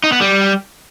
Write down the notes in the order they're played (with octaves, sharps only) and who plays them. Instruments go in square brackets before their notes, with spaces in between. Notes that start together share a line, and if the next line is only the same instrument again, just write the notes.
[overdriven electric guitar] D#4
B3
G3